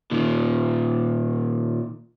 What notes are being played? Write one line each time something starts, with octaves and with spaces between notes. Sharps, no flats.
A#2 D#3